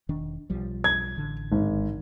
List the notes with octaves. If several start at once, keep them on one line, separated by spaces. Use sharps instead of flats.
E1 D#3 D4
B1 F3 G3
G#6
A1 D3
G#1